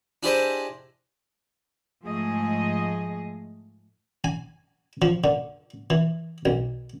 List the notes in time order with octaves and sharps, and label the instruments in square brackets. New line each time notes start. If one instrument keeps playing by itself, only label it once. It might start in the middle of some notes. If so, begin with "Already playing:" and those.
[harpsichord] D4 E4 G4 G#4 C5 D#5
[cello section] G#2 F3 A3 G#4 D#5
[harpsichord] G#5
F3
D3
E3
B1